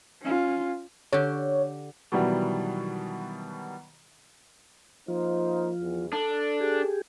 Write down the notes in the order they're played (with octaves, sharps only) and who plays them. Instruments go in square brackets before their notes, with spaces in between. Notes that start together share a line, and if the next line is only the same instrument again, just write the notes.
[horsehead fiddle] C#4 F4
[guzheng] D3 G4 [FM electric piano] C#5
[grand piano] B2 D#3 E3 F#3 G3
[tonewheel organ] F3 F4 [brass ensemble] A#3 D#4 C5
[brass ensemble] E2
[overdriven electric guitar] D4 [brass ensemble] A4
[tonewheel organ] G4 G#4